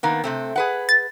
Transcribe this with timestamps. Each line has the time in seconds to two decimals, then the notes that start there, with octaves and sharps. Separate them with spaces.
0.03 D#3 A#3 B3
0.24 C3 A3 C4
0.56 G#4 B4 F#5
0.89 A6